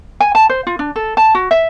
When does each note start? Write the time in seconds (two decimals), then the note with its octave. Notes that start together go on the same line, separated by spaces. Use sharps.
0.20 G#5
0.35 A5
0.50 C5
0.67 F4
0.79 D4
0.96 A4
1.17 A5
1.35 F#4
1.51 E5